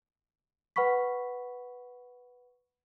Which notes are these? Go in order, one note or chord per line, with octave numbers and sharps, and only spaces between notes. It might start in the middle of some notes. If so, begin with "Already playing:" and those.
B4 F#5 B5 C#6 B6